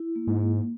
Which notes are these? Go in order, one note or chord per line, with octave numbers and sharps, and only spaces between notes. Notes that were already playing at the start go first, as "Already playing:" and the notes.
Already playing: E4
A#3
G#2
A#3